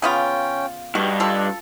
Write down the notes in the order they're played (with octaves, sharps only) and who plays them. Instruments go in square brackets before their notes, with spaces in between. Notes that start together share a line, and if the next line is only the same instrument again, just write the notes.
[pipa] C#3 B3 F4 [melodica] C#4 G5
[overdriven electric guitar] G2 [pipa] F#4 [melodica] D#5
[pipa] F4 A4